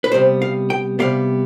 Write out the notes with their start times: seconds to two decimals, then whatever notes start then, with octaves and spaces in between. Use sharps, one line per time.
0.04 B4
0.12 C3 G3 B3 C5
0.42 F5
0.70 G5
0.99 C3 G3 B3 F5